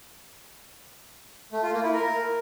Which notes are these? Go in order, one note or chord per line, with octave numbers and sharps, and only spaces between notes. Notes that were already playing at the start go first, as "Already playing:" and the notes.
A3
F4
A#3
E4
A#4